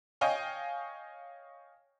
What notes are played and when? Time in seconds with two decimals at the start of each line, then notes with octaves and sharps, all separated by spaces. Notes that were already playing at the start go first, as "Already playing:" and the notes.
0.21 C#5 D#5 F5 G5 G#5